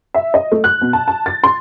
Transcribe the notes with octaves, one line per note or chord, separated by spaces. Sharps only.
E5
D#5
A3
F#6
B2
A5
A5
A6
C6